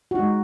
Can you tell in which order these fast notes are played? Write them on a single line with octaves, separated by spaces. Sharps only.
F#4 D#4 G#3